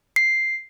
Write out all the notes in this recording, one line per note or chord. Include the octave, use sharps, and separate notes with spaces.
C7